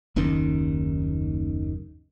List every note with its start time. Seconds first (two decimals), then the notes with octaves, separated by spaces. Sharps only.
0.16 F#1 D#2 D#3 C#4